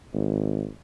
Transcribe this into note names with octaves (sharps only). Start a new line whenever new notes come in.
G#1